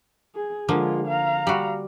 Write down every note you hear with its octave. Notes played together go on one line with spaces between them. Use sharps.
G#4
D3 F3 G#3 A#3 F4
F5 A#5
G3 F#4